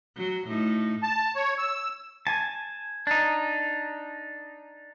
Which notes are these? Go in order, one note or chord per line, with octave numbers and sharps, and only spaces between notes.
F#3
A2 D#4
A5
C#5
E6
G#5 A5
D4 D#4